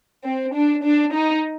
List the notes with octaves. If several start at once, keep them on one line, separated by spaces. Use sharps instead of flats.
C4
D4
D4
D#4